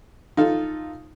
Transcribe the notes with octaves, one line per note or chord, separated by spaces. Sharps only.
D#4 F4 A4